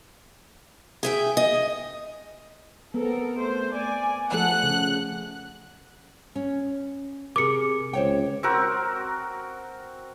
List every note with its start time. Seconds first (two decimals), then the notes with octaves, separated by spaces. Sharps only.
1.03 G#4 E5 G5
1.37 D#5
2.94 B3 C4 A4 A#4
3.38 A3 C5
3.74 D5 G#5
4.32 F3 A3 A4 F#5 F#6
4.63 C#3
6.36 C#4
7.36 C3 G#4 A#4 D6 C#7
7.93 C#2 C5 C#5 G5
8.43 C4 F#4 A#4